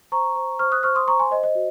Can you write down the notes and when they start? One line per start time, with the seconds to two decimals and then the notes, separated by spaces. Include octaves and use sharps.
0.12 C5 A#5 C#6
0.36 C5
0.59 C5 C#6 F6
0.72 D#6 F#6
0.83 C5 C#6 F6
0.95 C6 D#6
1.07 C5 A#5 C#6
1.19 G#5 C6
1.31 C5 D#5
1.43 D#5
1.55 F#4